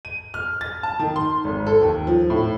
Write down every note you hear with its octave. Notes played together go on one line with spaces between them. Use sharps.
D#7
F6
A6
A5
D#3
C6
G#1
A4
D#2
F3
A2